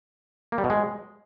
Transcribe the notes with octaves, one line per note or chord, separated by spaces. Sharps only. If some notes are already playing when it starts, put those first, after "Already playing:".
A#3
G3
B2
G#3